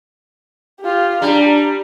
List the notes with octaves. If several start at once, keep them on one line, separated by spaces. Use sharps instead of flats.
F4 G4
G3 D4 A#5